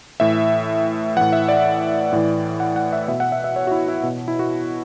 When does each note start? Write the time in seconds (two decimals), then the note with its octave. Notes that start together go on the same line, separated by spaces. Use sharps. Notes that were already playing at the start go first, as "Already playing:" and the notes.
0.20 A2 E3 E5
1.16 A2 E3 F#5
1.33 E5
1.48 D5
2.13 A2 E3
2.60 F#5
2.76 F#5
2.93 E5
3.08 B2 E5
3.20 F#5
3.32 E5
3.44 E5
3.56 C#5
3.67 F#4
3.72 E4
3.88 E4
4.03 B2
4.28 E4
4.39 F#4